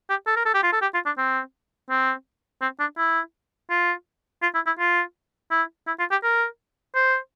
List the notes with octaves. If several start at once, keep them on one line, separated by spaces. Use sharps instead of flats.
G4
A4
A#4
A4
G4
F4
A4
G4
F4
D4
C4
C4
C4
D4
E4
F4
F4
E4
E4
F4
E4
E4
F4
G4
A#4
C5